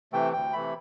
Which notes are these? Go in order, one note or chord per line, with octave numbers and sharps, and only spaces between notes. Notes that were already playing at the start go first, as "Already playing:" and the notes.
C3 E3 A3 G5
D2 G5
C3 E3 A3 B5